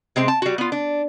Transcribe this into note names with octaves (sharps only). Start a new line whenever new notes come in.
C3 G#3 C4
A5
G3 F#4
B3 F4
D4